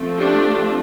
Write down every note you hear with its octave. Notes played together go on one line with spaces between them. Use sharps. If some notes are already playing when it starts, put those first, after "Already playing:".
Already playing: F3 A3 C4
D4 G4